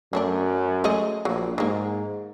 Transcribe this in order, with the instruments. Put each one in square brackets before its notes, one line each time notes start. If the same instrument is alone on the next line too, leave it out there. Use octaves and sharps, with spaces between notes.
[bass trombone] F#2 [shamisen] F#3 A3 D4
[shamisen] G#3 A3 D#5
[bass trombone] A#1 [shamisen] F#3 A#3
[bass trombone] G#2 [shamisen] D#3 A#3